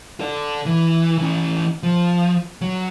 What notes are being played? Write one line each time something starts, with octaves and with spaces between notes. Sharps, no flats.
A4 D5
E3
E3 C#4
F3
F#3